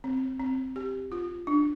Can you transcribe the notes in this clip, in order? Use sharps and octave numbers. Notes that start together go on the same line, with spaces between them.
C4
C4
G4
F4
D4